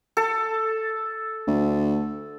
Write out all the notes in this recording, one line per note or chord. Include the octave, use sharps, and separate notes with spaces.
A4
D2